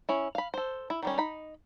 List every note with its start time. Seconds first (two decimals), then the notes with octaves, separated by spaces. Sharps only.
0.09 C#4 E4
0.35 F5 B5
0.54 A4 C5
0.90 E4
1.03 D#3 G3 C#4
1.18 D#4 B5